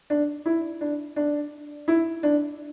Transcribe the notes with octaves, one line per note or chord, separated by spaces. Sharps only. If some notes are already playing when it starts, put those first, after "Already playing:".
D4
E4
D4
D4
E4
D4